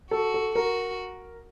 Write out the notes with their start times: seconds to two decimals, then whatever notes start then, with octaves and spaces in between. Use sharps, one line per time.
0.11 F#4 A4
0.34 A4
0.55 F#4 A#4